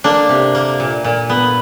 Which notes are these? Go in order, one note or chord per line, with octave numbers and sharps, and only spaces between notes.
A#3 D4
C3
A#3
A#2
A#2
B3